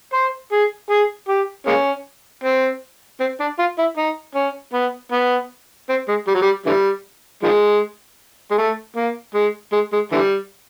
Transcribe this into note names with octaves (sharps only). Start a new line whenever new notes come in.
C5
G#4
G#4
G4
G#3 A#3 C#4
C4
C4
D4
F4
E4
D#4
C#4
B3
B3
C4
G#3
G3
F#3
G3
D3 E3 G3
D#3 F3 G#3
G#3
A3
A#3
G#3
G#3
G#3
D3 E3 G3